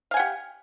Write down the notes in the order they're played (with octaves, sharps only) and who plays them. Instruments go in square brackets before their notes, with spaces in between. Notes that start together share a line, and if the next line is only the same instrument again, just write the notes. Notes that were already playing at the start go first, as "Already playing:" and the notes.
[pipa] F5
G#5
F#5
G4